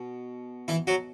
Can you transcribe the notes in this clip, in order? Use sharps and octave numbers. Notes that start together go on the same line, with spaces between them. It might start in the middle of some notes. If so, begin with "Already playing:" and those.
Already playing: B2
E3 E4
F#3 F#4